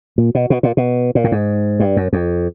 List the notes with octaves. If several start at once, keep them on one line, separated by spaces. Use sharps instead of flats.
A#2
B2
B2
A#2
B2
A#2
A2
G#2
G2
F#2
F2